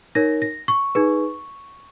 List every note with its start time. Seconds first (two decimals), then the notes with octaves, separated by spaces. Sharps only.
0.15 D#4 A#4 C#5 A#6
0.42 A#6
0.68 C#6
0.95 D#4 G#4 B4